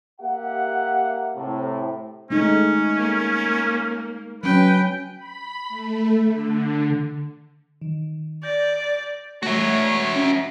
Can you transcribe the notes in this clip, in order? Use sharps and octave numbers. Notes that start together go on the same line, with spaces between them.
A#3 G4 E5 F#5
A2 C3
G#3 A3 C#4 D#4
A#3
F#3 C#4 B4 G5
B5
A3
D3
D#3
D5 G6 A#6
A3 F#4 C#5 E5
C#4